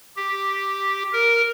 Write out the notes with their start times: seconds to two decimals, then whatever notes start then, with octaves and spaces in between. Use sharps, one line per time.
0.17 G4
1.13 A#4